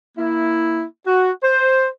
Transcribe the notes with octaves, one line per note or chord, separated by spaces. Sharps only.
A#3 E4
F#4
C5